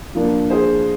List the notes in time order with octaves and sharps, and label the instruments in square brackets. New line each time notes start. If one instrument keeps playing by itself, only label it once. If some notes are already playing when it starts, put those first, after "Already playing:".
[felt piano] F3 A#3 D4
G#4 C5